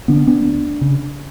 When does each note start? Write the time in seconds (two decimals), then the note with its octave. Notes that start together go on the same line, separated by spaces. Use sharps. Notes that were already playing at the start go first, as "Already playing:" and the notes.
0.08 D3 B3 D4
0.27 B3 D4
0.45 D2
0.81 C#3